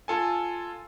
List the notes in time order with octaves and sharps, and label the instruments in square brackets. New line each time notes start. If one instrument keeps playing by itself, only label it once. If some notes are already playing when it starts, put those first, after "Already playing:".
[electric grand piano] F4 A4 G#5